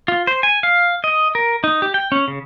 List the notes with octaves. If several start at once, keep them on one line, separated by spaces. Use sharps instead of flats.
F4
C5
G#5
F5
D#5
A#4
D#4
G4
G5
C#4
C#3